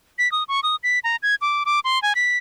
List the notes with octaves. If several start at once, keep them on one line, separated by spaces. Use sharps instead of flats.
B6
D#6
C#6
D#6
B6
A#5
G#6
D6
D6
C6
G#5
B6